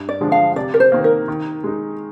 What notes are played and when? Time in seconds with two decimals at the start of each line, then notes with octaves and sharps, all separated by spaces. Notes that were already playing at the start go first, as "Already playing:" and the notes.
Already playing: G2
0.09 D5
0.21 D3 F3 G#3 D4
0.32 F5
0.56 C3 D5
0.74 A#4
0.80 C5
0.92 D#3 A#3
1.04 A#4
1.28 D#3
1.64 G#3 D#4